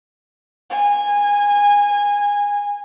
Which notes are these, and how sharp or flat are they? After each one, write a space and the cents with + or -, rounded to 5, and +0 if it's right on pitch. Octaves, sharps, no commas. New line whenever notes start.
G#5 -20